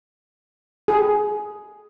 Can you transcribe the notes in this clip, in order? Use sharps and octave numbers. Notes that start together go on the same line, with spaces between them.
G#4